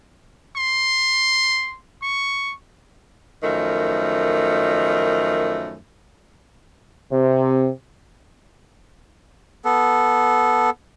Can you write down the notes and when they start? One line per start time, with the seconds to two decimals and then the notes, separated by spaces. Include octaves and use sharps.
0.57 C6
2.02 C#6
3.43 F#2 D#3 F3 A3
7.12 C3
9.65 B3 A4